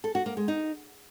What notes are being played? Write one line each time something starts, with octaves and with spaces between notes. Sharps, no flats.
A4
F#4
A#3
G#3
D#4